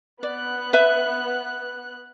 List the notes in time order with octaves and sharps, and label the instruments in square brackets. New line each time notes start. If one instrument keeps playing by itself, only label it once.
[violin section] B3 F#6 [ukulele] D5
[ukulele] B4 E5